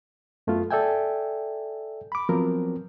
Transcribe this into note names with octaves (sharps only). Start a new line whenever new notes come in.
F#2 A3 B3 F4
A4 D5 E5 G5 G#5
B5 D6
F3 F#3 B3 C4 A#4